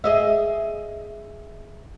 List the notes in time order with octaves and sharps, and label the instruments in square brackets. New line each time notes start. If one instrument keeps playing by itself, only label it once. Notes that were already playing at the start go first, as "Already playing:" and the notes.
[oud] G#4 D#5 E5